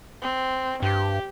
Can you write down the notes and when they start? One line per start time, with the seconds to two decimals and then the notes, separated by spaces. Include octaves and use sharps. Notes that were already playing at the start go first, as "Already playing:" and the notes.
0.22 C4
0.82 G2 G4